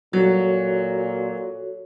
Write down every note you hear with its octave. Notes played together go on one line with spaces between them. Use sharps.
A#2 F#3 F#4 A4 C#5